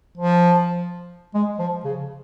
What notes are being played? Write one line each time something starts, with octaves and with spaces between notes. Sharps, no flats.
F3
G#3
F3
C#3